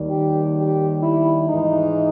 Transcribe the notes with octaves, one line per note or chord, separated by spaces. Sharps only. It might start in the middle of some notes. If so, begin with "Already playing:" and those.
Already playing: D#2 D#3 G3
G4
G4
E4
G#2 E3 G#3 D#4